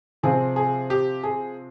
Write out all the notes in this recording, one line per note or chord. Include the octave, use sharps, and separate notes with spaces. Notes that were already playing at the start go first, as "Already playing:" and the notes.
C3 F3 C4 F4 G#4
G#4
G4
G#4